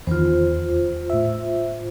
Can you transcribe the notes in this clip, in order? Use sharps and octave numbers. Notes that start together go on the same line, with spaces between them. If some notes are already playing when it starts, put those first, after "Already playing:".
E2 D#3 F4 C5
A2 E5